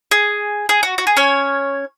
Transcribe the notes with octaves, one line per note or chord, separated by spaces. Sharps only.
G#4
G#4
F#4
F#4
G#4
C#4 C#5